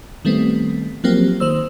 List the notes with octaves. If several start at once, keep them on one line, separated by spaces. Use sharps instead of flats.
D#3 G3 A3 B3 C4
F3 F#3 A#3 C4 G4
D#3 C5 E6